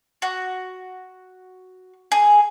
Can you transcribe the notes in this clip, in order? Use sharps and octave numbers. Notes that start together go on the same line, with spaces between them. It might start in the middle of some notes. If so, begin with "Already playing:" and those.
F#4
G#4